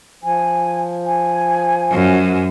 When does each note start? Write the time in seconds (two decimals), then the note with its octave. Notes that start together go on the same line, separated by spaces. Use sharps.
0.23 F3 G#5
1.06 G#5
1.91 F#2